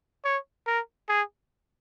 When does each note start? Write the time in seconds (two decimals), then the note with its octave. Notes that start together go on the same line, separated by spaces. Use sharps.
0.25 C#5
0.67 A#4
1.09 G#4